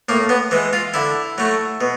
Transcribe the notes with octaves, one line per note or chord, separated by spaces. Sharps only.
A2 A#3
B3
E3 G#3
F4
D3 E4
F#3 A3
B2